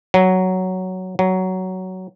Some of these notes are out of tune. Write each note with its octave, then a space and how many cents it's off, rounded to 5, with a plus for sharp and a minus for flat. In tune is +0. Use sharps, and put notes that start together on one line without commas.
F#3 +5
F#3 +10